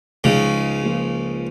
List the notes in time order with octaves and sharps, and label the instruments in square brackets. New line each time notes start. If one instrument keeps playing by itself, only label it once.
[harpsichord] C#2 C#3 [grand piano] F3 G#3 D#4 G#4
[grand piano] F3 A#3 F4